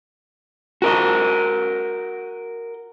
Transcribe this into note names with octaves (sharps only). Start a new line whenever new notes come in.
F#4 A#4 D#5